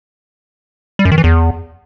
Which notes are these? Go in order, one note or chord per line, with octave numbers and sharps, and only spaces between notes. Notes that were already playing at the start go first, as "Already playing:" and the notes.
G3
F#2
D#3
E3
E2